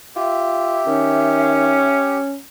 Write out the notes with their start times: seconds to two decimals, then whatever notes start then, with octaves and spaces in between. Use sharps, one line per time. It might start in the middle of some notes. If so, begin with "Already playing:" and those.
0.16 F4 G4 E5
0.87 D#3 C#4